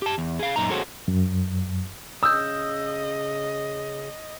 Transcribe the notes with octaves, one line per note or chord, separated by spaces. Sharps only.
G4 A5
E2
G#4 F5
F#2 A#2 D#4 A#5
F#4 G#4 A4 C5 C#5 F#5
F#2
C#3 D#5 D#6 E6 G6